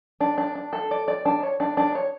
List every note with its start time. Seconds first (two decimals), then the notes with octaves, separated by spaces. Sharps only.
0.20 D4
0.38 D4
0.55 D4
0.73 A4
0.91 D5
1.08 D5
1.25 D4
1.43 C#5
1.60 D4
1.77 D4
1.95 C#5